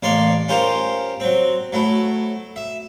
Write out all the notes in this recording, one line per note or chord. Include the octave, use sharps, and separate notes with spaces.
A1 A#3 C#5 D5 C6
C#4 F4 G4 A#4 C5
F#3 C4
F#3 A3 E4
E5